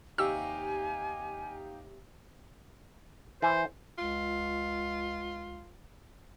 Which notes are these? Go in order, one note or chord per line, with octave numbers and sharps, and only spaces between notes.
D#2 C3 D#4 G4 F5 G#5 C#6 E6
E3 B4 C5 G#5
C#2 F4